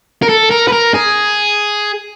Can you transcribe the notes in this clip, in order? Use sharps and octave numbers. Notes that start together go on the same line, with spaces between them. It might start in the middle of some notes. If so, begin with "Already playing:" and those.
A#4
A4
A#4
B4
A#4
G#4